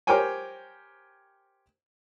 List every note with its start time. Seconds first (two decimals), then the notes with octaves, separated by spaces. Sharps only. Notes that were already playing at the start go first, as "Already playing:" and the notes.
0.07 G4 A#4 C5 C#5 G5 G#5